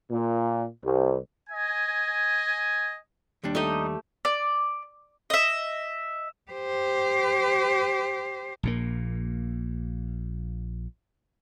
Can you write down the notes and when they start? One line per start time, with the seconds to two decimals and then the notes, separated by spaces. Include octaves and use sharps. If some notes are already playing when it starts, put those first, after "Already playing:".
0.11 A#2
0.84 C2
1.50 D#5 G#5
3.44 D#2 G3 D4
3.55 A3 D#4 G4 D#5
4.25 D5
5.30 D#5 E5
6.51 G4 C5
8.63 A#1 A#2 A#3